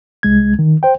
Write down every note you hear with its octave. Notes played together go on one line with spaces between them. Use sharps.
C2 G#3 G#6
D#3
C5 G5